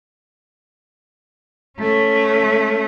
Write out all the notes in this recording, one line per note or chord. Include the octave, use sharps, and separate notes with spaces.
A3 C#4